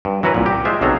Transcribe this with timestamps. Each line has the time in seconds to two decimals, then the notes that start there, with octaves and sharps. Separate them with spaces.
0.05 G2
0.23 E3 F#3 F#4 A#4 B4
0.34 C2 A#2
0.46 G4
0.65 G#3 F4 C5 E5
0.81 B1 C3 F#3 G#4 A4 A#5